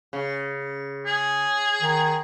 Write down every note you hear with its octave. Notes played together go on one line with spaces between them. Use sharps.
C#3
G#4
D#3